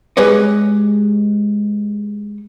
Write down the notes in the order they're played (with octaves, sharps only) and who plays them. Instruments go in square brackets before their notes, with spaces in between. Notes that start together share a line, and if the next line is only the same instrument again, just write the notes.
[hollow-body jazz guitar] G#3 G4 B4 C#5 D#5